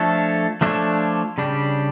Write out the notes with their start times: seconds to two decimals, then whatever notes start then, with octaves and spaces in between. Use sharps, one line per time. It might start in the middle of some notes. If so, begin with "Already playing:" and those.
Already playing: F3 A3 D4 A4 C#5
0.61 F3 A3 D4 A4 C#5
1.38 C#3 G3 D4 G4